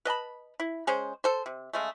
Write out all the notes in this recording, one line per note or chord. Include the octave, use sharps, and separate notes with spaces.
B4 D#5 A5 B5
E4
G#3 C#4 G#4 C5
A4 C5
C3
C#3 G#3 A3